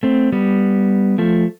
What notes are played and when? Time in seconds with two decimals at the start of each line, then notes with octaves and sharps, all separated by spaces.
0.03 A3 C4
0.32 G3 B3
1.18 F3 A3